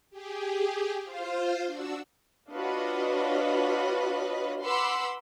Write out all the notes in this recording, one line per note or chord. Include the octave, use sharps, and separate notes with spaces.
G4 G#4
F4 C5 F5
D4 F#4 E6
D4 F4 F#4 B4 C#5 D#5
B4 F#5 B5 C6 D6 E6